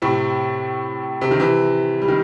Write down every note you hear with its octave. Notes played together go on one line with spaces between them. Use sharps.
A2 C3
C3
D#3
C3 E3
G3
D#3